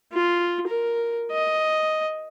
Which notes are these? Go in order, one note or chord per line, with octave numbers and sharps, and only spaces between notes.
F4
A#4
D#5